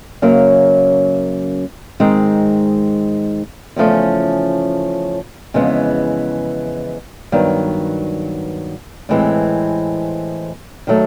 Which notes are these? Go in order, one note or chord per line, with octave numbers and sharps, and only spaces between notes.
F#2 C#3 F#3 A#3
G#2 D#3 G#3 C4
E2 C#3 F3 A3 C#4
F2 C#3 E3 G#3 B3
G2 D#3 F#3 B3
A2 E3 G#3 C4
D#3 F#3 A3